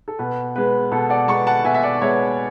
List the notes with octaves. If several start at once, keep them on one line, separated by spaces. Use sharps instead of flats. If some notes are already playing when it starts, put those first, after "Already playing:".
A4
B2 B4
G#3 B3 B4
B2 A4
D5 F#5
G#3 B3 A5 C#6
F#5 A5
B2 E5 G#5
E5
D5 F#5
G#3 B3 C#5 E5